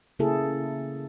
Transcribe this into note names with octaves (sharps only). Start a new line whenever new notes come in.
C#3 A#3 E4 G#4 A4